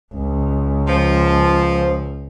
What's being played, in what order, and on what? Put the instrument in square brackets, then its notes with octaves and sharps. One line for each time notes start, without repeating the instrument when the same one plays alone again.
[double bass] C#2
[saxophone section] F3